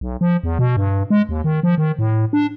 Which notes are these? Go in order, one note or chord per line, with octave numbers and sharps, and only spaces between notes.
B1
F3
E2
B2
G2
G#3
D#2
D#3
F3
D#3
A2
D4